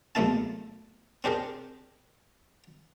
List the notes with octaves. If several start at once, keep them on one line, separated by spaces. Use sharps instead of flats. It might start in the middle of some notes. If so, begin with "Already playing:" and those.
B1 E2 A3 A#3 E4 A5
C4 D4 G4 G#4 A#4